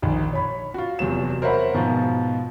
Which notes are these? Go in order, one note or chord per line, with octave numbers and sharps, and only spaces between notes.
A#1 D#3
C#5 B5
F4 F#4
F1 E2 F#3 E7
A#4 C5 C#5 E5 F#5 B5
G#2 B2 F3